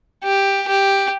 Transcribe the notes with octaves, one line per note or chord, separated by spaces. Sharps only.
G4
G4